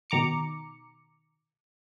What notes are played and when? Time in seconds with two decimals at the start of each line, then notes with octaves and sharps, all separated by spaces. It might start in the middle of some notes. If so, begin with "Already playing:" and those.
0.10 B2 D#3 A#5 D6 C#7